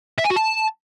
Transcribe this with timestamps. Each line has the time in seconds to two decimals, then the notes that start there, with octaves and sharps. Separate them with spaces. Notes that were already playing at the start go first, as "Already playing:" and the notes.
0.18 E5
0.24 G#5
0.30 F#4
0.36 A5